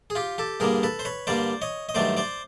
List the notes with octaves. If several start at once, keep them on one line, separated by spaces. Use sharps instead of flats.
G#4
F4 G4
G4 A4
G2 D3 G3 A#3 G#4 A#4
A4 B4
C5
B4 C#5
G2 D3 G3 A#3 C5 D5
C#5 D#5
D#5
G2 D#3 F#3 A3 C5 D5
C5 D5